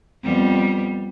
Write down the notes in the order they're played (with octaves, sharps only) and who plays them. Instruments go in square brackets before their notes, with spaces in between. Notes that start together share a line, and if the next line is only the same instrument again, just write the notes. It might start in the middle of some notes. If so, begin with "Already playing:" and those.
[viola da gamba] F2 G3 B3